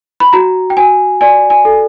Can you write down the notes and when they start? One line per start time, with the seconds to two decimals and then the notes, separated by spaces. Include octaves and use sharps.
0.20 B5
0.33 F#4 A#5
0.70 G5
0.77 F#4 G#5
1.21 D5 G#5
1.50 G#5
1.65 A4